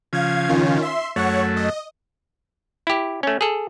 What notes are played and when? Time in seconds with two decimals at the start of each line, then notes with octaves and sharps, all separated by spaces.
0.13 C#3 F3 F5 G#6
0.49 D#3 C#4 F4
0.82 E5 C6
1.16 F#2 A3 C#5 F#5 C#6
1.57 D#5
2.87 E4 G4
3.23 A3 C#4
3.41 G#4 A4